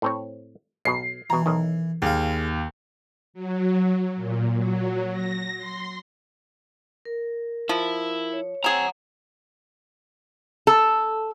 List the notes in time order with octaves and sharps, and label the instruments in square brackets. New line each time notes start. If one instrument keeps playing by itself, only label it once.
[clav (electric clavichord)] A2 C4 C#5
[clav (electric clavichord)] B1 B2 [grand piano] C7
[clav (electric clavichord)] B2 A#5 [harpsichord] E3
[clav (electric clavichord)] B1 D#3
[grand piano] D#2 [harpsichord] G#4 F5
[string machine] F#3
A#2
F#3
A#6
C6
[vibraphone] A#4
[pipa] F3 [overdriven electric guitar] E4
[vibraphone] C#5
[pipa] C4 G#4 [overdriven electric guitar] F#5 A#5
[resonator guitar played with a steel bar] A4